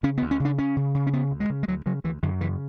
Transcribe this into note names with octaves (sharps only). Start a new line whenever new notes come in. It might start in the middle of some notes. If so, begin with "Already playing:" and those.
C#3 C#4
B3
D2
C#4
C#3
D4
C#3 C#4
C#3
C#3
C#4
C#3 B3
D2
G#3
C#3
G#3
D2 F#3
C#3 F#3
D2 E3
F#2 D3
C#3 E3